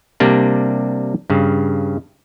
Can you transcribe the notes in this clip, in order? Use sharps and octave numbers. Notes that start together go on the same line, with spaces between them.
C3 G3 A#3 D4
G2 C#3